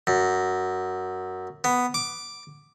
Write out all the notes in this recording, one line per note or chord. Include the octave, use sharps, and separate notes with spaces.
F#2
B3
D6